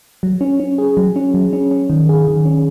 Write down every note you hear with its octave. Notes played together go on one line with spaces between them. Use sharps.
F#3
C#4
C#4
G#4
F#3
C#4
F#3
C#4
C#4
D#3
G#4
D#3
C#4